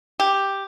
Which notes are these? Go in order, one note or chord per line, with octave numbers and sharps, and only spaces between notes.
G4